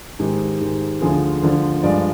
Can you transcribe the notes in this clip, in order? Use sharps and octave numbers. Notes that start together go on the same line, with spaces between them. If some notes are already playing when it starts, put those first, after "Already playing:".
G#2 D#3 G#3 G4
G#2 D#3 G#3
D2 D3 F3 G#4
D2 D3 F3
G2 F3 G#3 D5